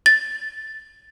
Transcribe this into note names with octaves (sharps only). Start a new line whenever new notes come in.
A6